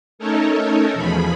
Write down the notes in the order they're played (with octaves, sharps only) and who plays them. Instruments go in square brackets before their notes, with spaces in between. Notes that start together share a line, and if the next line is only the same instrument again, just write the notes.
[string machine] A3 C#4 D#4 A4 A#4 C#5
E2 B2 F3 G#4 B5